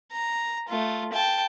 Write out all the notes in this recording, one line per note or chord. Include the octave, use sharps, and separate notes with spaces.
A#5
A3 F4
G5 A5